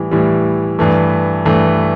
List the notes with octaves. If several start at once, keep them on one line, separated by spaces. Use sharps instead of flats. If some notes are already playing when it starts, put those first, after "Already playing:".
Already playing: A2 E3 G3
A2 E3 G3
G2 E3 A3
G2 E3 A3